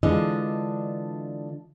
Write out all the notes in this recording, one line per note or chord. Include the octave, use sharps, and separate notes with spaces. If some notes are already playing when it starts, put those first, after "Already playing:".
D3 E3 G#3 D4 F4 D#5